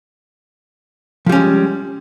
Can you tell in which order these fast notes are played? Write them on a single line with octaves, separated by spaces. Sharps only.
F3 G3 C#4 G#3